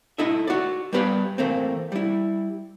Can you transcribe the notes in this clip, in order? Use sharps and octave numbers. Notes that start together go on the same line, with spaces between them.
D#4 E4 A4 D#5 E5
F#4 D5
G3 B3 G4 B4 D5 F5
E3 A3 A#3 C4
G3 E4